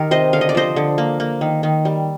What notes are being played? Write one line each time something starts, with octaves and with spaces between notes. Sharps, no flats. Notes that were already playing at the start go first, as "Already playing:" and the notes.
Already playing: D#3 G4 A#4
C3 C5 D#5
D3 F5
D#5
D5
F3 C5 D#5
D3
A#3
A#3
D#3
D#3
G3